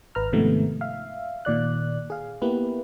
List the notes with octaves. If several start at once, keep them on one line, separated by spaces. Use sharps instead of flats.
G#1 B4 A#5 F6
G#2 C3 D#3 F3 A3 B3
E5 F5
A#2 D#3 D5 F#6
G#4 F5
A#3 B3 E4 G4 B4